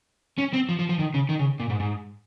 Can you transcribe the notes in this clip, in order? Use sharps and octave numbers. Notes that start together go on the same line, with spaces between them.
C#4
C4
F3
F3
F3
D#3
C#3
D#3
C#3
A#2
G#2
G#2